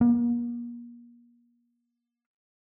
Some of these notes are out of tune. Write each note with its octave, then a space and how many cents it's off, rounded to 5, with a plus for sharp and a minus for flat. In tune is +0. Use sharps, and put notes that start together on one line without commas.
A#3 +40